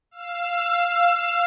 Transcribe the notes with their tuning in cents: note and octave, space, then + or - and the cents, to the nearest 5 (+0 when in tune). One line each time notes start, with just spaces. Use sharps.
F5 +0 E6 +25